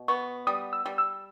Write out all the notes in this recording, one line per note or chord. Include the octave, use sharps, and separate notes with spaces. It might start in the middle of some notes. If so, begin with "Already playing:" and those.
Already playing: B2
B3 C#6
G3 D#6
E6
G3
E6